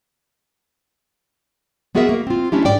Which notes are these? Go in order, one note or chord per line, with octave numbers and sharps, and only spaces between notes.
G#3 B3 F#4 G#4 A#4 E5
A#3
C4 F4
A3 C#4 D4 E4 G4
G#2 D5 G5